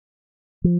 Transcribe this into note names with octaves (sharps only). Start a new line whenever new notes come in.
F3